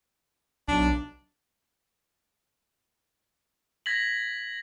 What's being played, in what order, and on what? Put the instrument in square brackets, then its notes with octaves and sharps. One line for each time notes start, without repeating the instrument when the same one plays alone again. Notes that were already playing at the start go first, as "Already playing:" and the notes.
[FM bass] B1 [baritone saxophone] D4
[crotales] G#6 A#6 B6 F#7